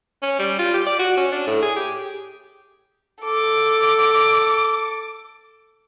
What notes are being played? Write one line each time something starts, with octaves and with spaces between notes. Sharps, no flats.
C#4
G3
F4
G4
D5
F#4
C#4
D4
A2
G#4
G4
A4 D6